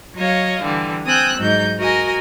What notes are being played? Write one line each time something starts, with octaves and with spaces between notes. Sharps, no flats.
F#3 C#5 D#5 F5
D3 E3 G3
C4 G#5 D#6 E6 F#6 G6
G#2 F#3 D#4 G6
F#4 A#4 D#5 G#5